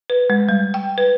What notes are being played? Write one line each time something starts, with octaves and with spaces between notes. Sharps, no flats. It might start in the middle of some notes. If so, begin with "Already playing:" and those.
B4
G#3
G3
G5
B4